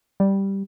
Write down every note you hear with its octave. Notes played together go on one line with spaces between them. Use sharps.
G3